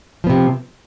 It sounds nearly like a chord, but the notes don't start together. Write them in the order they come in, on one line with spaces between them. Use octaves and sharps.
F3 B3 C3